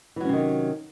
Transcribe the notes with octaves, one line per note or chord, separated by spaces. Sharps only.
C3 D#3 E3 F#3 C#4